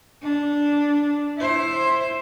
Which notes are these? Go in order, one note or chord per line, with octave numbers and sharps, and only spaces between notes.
D4
E4 C5